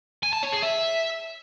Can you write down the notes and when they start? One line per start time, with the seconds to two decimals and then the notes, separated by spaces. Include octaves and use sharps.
0.23 G#5
0.33 A5
0.43 C#5
0.53 G#4
0.63 E5